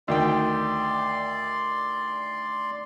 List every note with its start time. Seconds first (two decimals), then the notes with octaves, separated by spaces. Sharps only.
0.08 D2 D#3 D5 G5 C6